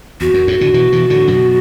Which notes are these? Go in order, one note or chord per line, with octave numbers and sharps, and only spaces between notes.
E2 F#4
F#2
E2 A2
A2 D3
B2 E3
B2 E3
A2 D3
F#2 B2